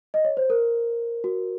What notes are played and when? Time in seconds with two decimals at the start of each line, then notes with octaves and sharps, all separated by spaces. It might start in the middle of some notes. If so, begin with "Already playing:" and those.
0.14 D#5
0.25 C#5
0.37 C5
0.50 A#4
1.24 F#4